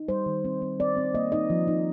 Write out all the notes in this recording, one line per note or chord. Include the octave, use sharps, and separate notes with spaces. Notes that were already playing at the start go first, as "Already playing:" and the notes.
Already playing: D#4
G3 C5
D#3
C4
C4
C4 D5
C4
A#3 D#5
D#4 D#5
F3
D#4